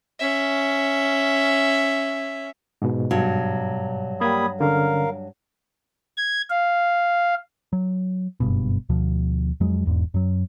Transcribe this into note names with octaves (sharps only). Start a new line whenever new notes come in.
C#4 E5
G#2 B2
G2 F#3
G3 A#3 B5 D#6 G#6
D3 C#4 A#4 F5
G#6
F5
F#3
F#1 G2 B2
D2 B2 F3
F2 F#3 G#3
E1 E2 G#2
F#2 F#3